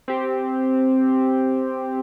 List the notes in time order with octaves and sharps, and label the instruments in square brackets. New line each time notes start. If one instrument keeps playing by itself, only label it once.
[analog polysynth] C4 G4